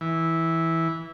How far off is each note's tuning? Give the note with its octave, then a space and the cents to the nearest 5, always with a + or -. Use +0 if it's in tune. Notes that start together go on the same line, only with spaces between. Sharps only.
E3 -10